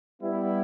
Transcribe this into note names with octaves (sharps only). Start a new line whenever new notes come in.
G3 B3 E4